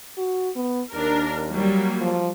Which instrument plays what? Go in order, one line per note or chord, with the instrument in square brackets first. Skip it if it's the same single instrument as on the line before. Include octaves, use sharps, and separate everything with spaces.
[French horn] F#4
B3
[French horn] D#2 [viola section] D4 A#4
[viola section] F#3 G3 A#3
[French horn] F3